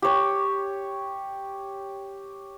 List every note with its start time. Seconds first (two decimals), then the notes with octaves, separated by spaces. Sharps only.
0.02 G4 C#5